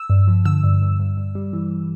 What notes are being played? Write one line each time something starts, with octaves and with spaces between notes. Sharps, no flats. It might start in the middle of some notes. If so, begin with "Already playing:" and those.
Already playing: E6
G2
F3
D3 E6
G2
G2
G2
G2
G3
E3